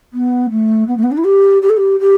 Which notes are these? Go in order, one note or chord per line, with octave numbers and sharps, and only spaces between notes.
B3
A3
B3
A3
B3
D4
E4
G4
G4
A4
G4
G4